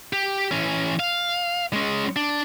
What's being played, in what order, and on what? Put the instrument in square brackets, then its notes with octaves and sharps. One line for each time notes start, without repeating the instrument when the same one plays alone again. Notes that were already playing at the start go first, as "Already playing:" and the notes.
[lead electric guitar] G4
E3 C#4
F5
G#3 C#4
D4